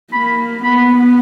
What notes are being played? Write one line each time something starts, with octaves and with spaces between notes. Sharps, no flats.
A#3 B5
B3 B5